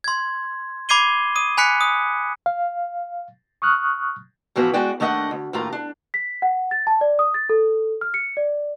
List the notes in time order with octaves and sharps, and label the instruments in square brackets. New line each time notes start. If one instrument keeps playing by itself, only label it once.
[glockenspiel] C6 G#6
B5 D6 G#6 C7 D#7 G7
D#6 D#7
G#5 B5 F#6 B6 C#7
D#6
[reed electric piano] F5
C#6 D#6 F6 F#6
[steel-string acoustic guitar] A2 E3 F3 B3 F#4
G#3 F#4 D5 G5
D#2 A3 D4 D#5 F#5
D2
D#2 A2 F4 A#5
D4
[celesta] B6
F#5
A6
A5
D5
D#6
A6
A4
F6
C#7
D5